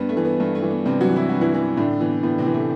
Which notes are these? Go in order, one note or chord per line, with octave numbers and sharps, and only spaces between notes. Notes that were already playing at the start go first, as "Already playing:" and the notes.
Already playing: G2 B3
A3
E3
B3
G2 A3
A3
E3
B3
G2 C3 C4
F#3 F#4
E3
E4
G2 F#4
E3 E4
E3
A2 D3 D4
E3 B3
A2 B3
C3 C4
E3
A3